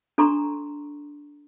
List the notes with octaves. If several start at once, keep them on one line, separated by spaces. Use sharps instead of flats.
D4 A4 A#5 C6 C#6